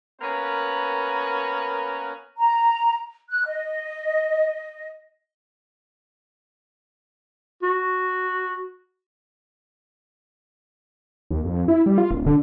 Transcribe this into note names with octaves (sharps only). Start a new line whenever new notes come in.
A#3 B3 C#4 A#4 B4
A#5
F#6
D#5
F#4
D#2
F2
E4
G3
F4
D1
D3